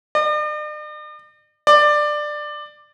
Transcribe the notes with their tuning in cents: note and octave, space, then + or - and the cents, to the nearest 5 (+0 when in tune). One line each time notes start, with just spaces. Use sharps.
D5 +45
D5 +15